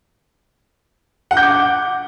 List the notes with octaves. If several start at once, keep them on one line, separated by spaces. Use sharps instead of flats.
F#5
G6
D6
F#5